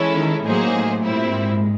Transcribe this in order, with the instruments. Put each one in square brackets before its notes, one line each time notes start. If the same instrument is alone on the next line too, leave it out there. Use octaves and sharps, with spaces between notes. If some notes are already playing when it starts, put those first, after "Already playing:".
Already playing: [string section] E3 G#3 C#4 E4 A4
[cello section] D#3 D#4
[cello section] A2 A3 [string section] F#3 A#3 D#4 G#4 C5
[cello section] A2 A3
[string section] A#2 G3 C4 E4
[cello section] G#2 G#3